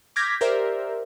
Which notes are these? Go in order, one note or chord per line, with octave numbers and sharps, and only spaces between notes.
D6 F6 G6 G#6 A#6 B6
G4 A#4 C5 D5 E5